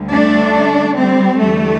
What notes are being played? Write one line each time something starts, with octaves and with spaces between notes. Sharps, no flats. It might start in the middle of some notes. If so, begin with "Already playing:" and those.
Already playing: D2 D3 G3
A3 D4
G3 C4
E2 D3 G3 A3